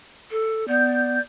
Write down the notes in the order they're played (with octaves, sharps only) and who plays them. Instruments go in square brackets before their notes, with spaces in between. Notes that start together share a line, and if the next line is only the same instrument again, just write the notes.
[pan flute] A4
[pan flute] B3 [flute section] D5 G6